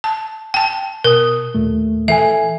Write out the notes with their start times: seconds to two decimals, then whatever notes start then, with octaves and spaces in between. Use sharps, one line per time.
0.04 A5
0.54 G5 A5
1.04 B2 A#4 D#6
1.54 D#2 A#2 A3
2.08 E3 A4 E5 G#5